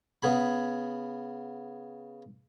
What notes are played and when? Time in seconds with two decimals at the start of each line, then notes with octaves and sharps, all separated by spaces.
0.22 C#3 B3 G#4 B5